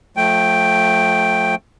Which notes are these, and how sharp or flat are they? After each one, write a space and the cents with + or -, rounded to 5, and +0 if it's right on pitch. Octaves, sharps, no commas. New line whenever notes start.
F3 +25 A3 -5 G5 +0